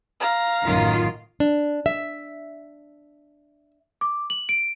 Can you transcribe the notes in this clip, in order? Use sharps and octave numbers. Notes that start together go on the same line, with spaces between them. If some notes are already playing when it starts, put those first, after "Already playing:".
F5 A#5
A1 F#2 A2 D#3 F4
D4
E5
D6
F#7
D7